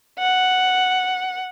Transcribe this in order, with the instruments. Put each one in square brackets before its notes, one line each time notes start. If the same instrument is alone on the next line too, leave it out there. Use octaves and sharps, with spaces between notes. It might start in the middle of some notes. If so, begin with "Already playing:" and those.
[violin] F#5